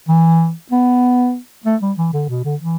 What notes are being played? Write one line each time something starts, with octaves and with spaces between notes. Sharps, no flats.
E3
B3
A3
G3
E3
D3
B2
D3
E3